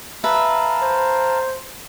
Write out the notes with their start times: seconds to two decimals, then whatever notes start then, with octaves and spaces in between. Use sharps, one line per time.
0.24 B4 E5 F5 A5 A#5
0.82 C5